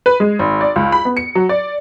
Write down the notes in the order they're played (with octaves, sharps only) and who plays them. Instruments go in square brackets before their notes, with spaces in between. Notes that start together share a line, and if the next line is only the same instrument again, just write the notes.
[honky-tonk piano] B4
G#3
G#1
D5
C#2
B5
B3
C#7
F#3
D5